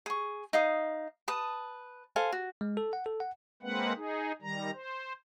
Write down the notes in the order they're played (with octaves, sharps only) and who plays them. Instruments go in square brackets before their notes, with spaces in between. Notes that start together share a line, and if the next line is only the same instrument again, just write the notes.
[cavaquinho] G#4 C#6
D#4 F5 D#6
B4 A5 D#6
A4 C5 F5 G#5
F#4
[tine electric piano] G#3
A4
F#5
A4
F#5
[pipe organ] G#3 A#3 C4 B4 F#5
D#4 G#4
D#3 G3 A#5
C5